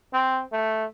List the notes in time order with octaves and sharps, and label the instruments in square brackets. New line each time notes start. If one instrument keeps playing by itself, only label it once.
[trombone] C4
A3